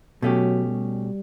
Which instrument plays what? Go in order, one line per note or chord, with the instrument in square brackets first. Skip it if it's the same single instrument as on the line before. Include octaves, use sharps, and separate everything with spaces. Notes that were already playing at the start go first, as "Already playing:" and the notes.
[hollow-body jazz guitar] B2 A3 C#4 G4 [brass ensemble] F#3
[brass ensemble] G3